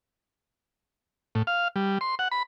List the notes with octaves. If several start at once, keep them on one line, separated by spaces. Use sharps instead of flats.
A2
F5
G3
C6
F#5
B5